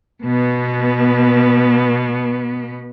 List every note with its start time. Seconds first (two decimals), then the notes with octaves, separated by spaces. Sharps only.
0.23 B2 B3